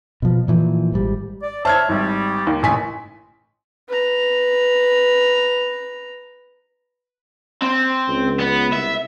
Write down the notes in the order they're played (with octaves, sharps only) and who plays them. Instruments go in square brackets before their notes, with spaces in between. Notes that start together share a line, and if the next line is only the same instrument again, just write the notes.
[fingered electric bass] B2 F3
A#2 E3 F3
G#1 G#2 G3
[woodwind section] D5
[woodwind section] C5 C#5 E5 [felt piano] A5 F6 G#6
[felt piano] G#1 [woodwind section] G3
[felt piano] D#2
A1 G#5 B6
[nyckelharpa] B4 A#5
[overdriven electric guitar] C4
[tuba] C#2
[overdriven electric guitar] B3
[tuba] C2 [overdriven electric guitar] E5